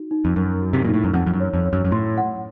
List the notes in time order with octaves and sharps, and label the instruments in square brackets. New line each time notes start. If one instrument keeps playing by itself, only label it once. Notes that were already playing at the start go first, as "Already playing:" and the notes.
Already playing: [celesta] D#4 F#4
D#4
[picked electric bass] F2
[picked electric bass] F#2 [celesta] A#4
[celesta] F#4
[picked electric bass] C3
[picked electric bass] A#2 [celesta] D#4
[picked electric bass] A2
F#2
[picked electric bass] F2 [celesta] F#5
[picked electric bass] F2
F#2
[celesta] C#5
[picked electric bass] F2
[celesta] C#5
[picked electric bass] F#2
F#2
[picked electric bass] A2 [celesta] C6
[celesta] F#5